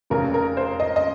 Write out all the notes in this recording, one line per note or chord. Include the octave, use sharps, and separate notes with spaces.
F1 D#2 C#3 A#4
A#4
C5
D#5
D#5